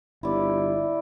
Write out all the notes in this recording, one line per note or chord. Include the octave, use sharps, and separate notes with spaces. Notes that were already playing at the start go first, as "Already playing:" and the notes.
G1 E4 D5